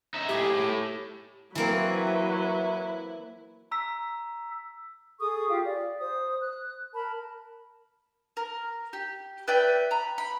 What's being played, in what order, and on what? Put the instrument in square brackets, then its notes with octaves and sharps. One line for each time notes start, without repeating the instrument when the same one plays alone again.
[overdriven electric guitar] D#4 E5
[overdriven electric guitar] A2 G#4 [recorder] G4
[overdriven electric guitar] A2
[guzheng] E3 A#3 C4 [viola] F#3 B4 [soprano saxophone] E4
[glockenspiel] A#5 E6 B6
[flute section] G#4 A4 C#6 D#6
F4 G4 F5 G5
D5
C5 D#6
F#6
A#4 A5 B5
[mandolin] A#4
G4
B4 D5 E5 G5
A#5 B5
B5